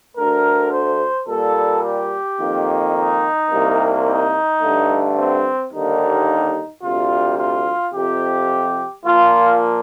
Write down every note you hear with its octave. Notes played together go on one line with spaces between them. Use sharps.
D2 D3 A3 A#4
C5
A#2 G3 A#3 A4
G4
F2 D#3 A#3
D#4
C2 C3 G3 A#3
D#4
G2 D3 A3
C4
D#2 D3 G3 A#3 D#4
D2 C3 G3 F4
F4
F2 C3 F3 G4
A#2 F3 A#3 F4